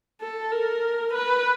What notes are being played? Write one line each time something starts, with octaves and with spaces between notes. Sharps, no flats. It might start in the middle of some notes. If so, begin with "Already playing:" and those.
A4
A#4
B4